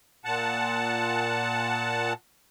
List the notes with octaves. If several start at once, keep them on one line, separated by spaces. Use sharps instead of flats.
A#2 F#5 A5